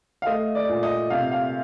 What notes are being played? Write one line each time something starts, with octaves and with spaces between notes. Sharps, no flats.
F5
A3 D#5
D5
A#2
D#5
C3 F5
F5